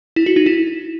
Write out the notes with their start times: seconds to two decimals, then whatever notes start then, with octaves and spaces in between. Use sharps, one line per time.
0.16 E4
0.26 F#4
0.36 D#4
0.46 E4